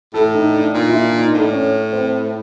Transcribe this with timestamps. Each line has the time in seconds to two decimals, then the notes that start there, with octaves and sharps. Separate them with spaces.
0.14 A2 A4
0.34 D#4
0.54 D4
0.74 A#2 D#4
0.89 E4
1.03 D4
1.18 D#4
1.33 A2 D4
1.53 C#4
1.93 C4